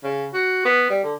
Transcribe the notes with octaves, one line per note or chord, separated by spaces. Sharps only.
C#3
F#4
B3
G3
D3